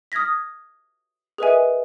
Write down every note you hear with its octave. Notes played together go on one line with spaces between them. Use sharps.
D#6 F6 G#6 A#6 B6
G#4 A#4 B4 D#5 E5 G#5